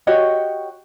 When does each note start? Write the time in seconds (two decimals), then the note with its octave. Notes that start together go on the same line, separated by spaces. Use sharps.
0.07 F#4 G4 C#5 D#5